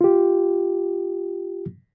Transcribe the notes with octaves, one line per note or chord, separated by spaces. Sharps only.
F4 G4